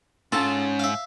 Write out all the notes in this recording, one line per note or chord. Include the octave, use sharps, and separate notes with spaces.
G#2 C#4 F4 A4 G#5 A5
E5 F5